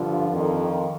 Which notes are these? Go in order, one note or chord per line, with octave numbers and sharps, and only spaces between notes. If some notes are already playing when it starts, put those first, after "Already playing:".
Already playing: G2 D3 F3 F4
F2 D#3